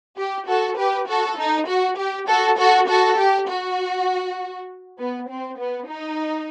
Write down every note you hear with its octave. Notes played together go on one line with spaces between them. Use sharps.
G4
F#4 A4
G4 B4
F#4 A4
D#4
F#4
G4
F#4 A4
F#4 A4
F#4 A4
G4
F#4
B3
C4
B3
D#4